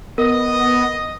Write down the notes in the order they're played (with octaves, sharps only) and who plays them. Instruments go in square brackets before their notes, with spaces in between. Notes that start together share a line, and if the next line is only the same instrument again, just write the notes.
[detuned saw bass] B3 [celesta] A#4 [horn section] D#5